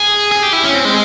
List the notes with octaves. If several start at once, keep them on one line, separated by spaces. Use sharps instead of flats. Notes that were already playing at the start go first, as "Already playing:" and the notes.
Already playing: G#4
G#4
G4
E4
C#4
C4
G#3